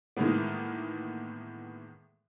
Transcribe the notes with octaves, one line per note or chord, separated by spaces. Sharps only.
A2 D#3 E3 G#3 A#3 B3